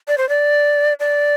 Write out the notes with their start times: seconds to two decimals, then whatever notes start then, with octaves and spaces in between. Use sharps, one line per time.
0.08 D5
0.18 C5
0.29 D5
1.00 D5